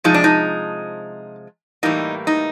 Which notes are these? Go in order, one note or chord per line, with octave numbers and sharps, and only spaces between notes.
C3 F3 G#3 D#4
D4
D#4
A2 E3 G3 A#3 D#4
D#4